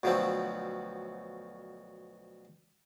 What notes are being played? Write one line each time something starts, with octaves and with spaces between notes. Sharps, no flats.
D2 B2 F3 F#3 A3 C4